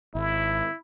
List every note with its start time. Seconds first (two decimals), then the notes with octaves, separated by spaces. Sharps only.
0.15 G#1 E4